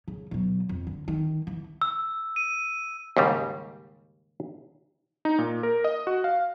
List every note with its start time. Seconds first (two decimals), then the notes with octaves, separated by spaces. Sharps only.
0.08 C#3
0.31 B2 F#3
0.69 F2
0.87 D3
1.08 D#3
1.47 E3
1.82 E6
2.36 D#7
3.17 D#2 G#2 C#3 G3
5.25 D#4
5.38 A#2
5.63 A#4
5.84 D#5
6.07 F#4
6.24 F5